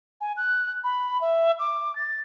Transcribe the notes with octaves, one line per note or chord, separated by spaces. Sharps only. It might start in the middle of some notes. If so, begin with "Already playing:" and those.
G#5
F#6
B5
E5
D6
A6